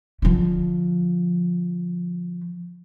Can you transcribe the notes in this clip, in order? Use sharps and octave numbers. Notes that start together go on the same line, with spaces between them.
D3 F3